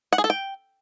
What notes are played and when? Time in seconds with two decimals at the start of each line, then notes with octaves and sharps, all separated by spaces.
0.13 F#5
0.18 G#4
0.24 A4
0.30 G5